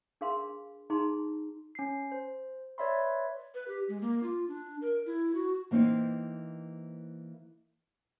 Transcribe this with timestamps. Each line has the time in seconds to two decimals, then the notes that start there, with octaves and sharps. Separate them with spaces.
0.21 D4 G#4 A#4 F5 C6
0.90 D#4 G#4 A5 A#5 C6
1.75 C#4 C7
2.12 C5
2.78 B4 C#5 D5 E5 B5 C6
3.55 B4
3.68 G4
3.88 G#3
4.01 A#3
4.23 F4
4.48 D4
4.81 A#4
5.06 E4
5.35 F#4
5.71 E3 A#3 C4 D#4